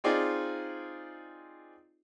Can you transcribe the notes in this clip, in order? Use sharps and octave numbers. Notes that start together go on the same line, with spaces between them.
C4 D#4 F4 G#4 D5 D#5